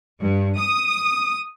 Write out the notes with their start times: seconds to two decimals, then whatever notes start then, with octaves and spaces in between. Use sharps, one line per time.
0.21 G2
0.58 D#6